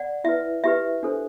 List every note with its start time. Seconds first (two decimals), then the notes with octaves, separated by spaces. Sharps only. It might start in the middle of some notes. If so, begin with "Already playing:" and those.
Already playing: D5 F#5
0.24 E4 B4 E5
0.64 E4 G4 B4 E5
1.03 D4 A4 C5